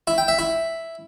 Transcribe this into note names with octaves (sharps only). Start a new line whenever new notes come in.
E4
G5
E5
E4